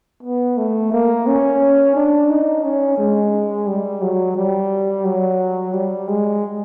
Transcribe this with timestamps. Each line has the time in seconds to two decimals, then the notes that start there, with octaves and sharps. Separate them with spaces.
0.23 B3
0.57 A3
0.92 A#3
1.27 C#4
1.95 D4
2.30 D#4
2.64 C#4
2.98 G#3
3.67 G3
4.02 F#3
4.36 G3
5.05 F#3
5.73 G3
6.08 G#3